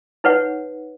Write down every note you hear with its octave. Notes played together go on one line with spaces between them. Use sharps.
D#4 B4 C#5 F#5